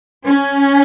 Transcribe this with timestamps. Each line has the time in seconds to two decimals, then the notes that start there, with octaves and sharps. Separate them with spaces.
0.25 C#4